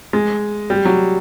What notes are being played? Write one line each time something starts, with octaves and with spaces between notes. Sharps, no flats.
G#3
G3
F#3